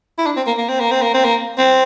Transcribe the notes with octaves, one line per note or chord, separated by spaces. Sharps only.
E4
D4
C4
A#3
A#3
C4
A#3
C4
A#3
C4
A#3
C4